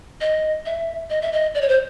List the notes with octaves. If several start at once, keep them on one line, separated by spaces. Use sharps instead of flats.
D#5
E5
D#5
E5
D#5
D5
C#5
C5